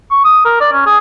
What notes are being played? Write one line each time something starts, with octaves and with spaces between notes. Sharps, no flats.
C#6
D#6
A#4
D5
C#4
G#4